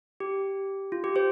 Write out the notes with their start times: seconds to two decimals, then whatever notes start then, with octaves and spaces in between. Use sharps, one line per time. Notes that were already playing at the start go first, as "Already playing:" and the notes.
0.20 G4
0.92 F4
1.04 G4
1.16 G4 C5